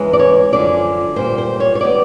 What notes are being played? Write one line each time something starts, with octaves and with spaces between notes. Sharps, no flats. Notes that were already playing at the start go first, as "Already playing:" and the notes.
Already playing: E2 C#3 E3 G#3
D5
C#5
F#2 D3 F3 D5
A#2 G3 A#3 C5
C5
C#5
C#5
D#3 G3 B3 D5